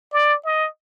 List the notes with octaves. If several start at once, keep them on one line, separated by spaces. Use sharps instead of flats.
D5
D#5